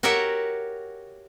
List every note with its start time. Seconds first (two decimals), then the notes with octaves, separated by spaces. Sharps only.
0.03 F#4 G4 A#4 C#5 E5 F#5